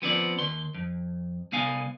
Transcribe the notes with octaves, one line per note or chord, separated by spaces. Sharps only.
F3 B3 C4 D5
D#2 C6
F2
C2 B3 F5 G#5